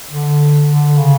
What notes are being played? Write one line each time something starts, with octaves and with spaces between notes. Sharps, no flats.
D3
D3
C#3